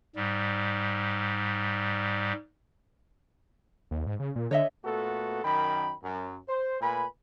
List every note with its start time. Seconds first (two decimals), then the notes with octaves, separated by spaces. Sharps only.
0.16 G#2 G3
3.91 D#2
4.07 G#2
4.20 C#3
4.36 A#2
4.51 D3 C#5 D#5 E5
4.85 A#2 A3 B3 F#4 A4
5.44 F#2 D#3 G5 B5
6.03 F#2
6.49 C5
6.81 A#2 A3 B4 G#5 B5